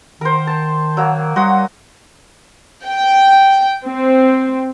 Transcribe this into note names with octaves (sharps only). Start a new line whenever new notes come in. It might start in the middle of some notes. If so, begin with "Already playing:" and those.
D#3 A#4 C5
A5
F#3 A#3
G3 F#4 C6 D#6
G5
C4